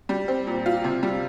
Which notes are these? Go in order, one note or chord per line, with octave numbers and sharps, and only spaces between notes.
G3
C4
A#2
F4
C3
G3